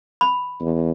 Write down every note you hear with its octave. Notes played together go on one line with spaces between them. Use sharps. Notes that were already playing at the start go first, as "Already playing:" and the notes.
B5
E2